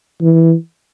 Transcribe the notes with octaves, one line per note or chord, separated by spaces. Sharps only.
E3